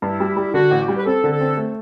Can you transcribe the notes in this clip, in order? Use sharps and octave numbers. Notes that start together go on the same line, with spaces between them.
G2 E4
G3
G3
D3 F#4
A1
G4
G3
B4
C4 A4
D3
A4
C4
A3